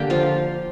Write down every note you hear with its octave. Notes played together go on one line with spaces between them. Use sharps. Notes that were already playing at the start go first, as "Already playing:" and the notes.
Already playing: D3 A#3 G4 A#4 G5
F3 F4 F5